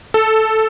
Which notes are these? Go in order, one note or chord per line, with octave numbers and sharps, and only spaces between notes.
A4